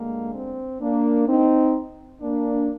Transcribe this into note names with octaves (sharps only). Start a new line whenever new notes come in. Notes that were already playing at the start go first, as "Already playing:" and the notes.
Already playing: D2 D3 G#3 A#3
C4
A#3 D4
C4 D#4
A#3 D4